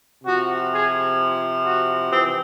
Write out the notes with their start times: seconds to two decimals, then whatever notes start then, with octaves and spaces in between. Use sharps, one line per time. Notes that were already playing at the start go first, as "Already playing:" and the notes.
0.24 C3 F3 F#4
0.71 G#4
1.64 F#4
2.11 E3 C4